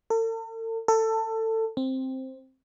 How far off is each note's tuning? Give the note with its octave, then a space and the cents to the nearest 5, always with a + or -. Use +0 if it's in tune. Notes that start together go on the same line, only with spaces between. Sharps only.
A4 +45
A4 +20
C4 +5